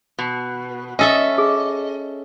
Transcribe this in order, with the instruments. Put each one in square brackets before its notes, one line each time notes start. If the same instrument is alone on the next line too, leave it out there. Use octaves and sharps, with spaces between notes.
[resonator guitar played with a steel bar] B2
[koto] C#4 A4 E5 [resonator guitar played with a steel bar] D#5
[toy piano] G#4